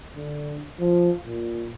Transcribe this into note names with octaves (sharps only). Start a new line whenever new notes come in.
D3
F3
A#2